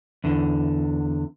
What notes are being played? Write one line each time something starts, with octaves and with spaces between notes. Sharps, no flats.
E2 D3